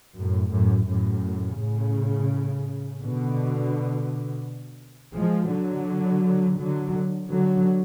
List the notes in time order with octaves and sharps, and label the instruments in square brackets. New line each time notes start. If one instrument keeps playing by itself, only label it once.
[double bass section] F#2 A2
F#2 A2
F#2 A2
A2 C#3
B2 D3
F3 G#3
D3 F#3
D3 F#3
D3 F#3